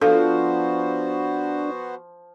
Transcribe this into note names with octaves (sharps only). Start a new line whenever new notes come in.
F3 B3 D4 F#4 A4 C5 F5